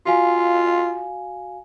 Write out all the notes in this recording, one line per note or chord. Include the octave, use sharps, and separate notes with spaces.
F4 F#4 F5 G#5